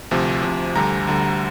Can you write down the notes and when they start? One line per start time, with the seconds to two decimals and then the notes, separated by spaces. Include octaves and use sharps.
0.11 D2 C3 F3
0.43 D2 C3 F3
0.75 D2 D3 G3 A#5
1.07 D2 D3 G3